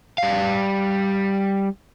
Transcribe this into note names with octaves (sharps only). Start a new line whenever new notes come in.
G3 F5